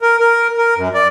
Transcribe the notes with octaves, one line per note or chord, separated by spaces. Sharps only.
A#4
A#4
A#4
F#2
D5